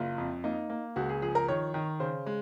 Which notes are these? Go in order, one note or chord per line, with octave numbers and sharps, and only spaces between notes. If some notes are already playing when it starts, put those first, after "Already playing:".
Already playing: F#1 F4
F2
A#3 D#4
A#3
C#2 F#4
G#4
F3 G#4
A#4
D#3 C#5
D#3
C#3 C5
G#3